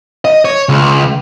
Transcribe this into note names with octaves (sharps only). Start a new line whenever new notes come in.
D#5
C#5
C#2